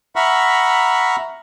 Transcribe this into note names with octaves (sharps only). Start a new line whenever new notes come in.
E5 F#5 A#5 B5 C#6 F6